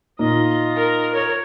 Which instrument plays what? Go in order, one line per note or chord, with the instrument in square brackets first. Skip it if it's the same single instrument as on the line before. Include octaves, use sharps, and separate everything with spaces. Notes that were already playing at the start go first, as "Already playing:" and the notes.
[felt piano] A#2 [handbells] D#4 [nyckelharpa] F4 D#5
[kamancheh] A#4
[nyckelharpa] C#5